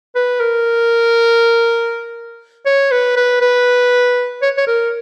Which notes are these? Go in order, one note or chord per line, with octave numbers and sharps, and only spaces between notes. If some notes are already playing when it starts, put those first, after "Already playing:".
B4
A#4
C#5
B4
B4
B4
C#5
C#5
A#4